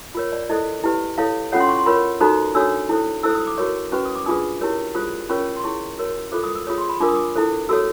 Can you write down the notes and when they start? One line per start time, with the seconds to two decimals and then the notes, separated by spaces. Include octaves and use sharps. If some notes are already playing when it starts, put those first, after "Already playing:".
0.15 F4 A#4 C#5
0.32 D5
0.49 E4 A4 C5 D#5
0.84 E4 G4 B4
1.18 E4 A4 C#5 F5
1.52 C#4 F4 A4 C#5 F#5
1.60 C6
1.69 C#6
1.78 C6
1.86 F4 A#4 C#5 B5
2.21 D#4 F#4 A4 C5 A#5
2.55 D4 F#4 A4 C#5 E6
2.89 E4 A4 C5
3.23 E4 A4 C5 E6
3.35 D#6
3.47 D6
3.58 F#4 A#4 C#5 C#6
3.92 C#4 F#4 B4 C#6
4.05 D#6
4.15 D6
4.26 D4 F4 G#4 B4 D#6
4.61 E4 G4 A#4 C#5
4.95 F4 G#4 C5 D#6
5.29 C#4 F4 A#4 C#5 C#6
5.57 C6
5.64 E4 G#4 C#5 C#6
5.98 F#4 A#4 C#5
6.32 F4 A4 C5 D6
6.44 D#6
6.55 E6
6.67 F4 G#4 C#5 D#6
6.78 C6
6.89 B5
7.00 D4 F4 A#4 D6
7.09 D#6
7.16 D6
7.35 E4 A4 C5
7.69 F#4 A4 C#5 E6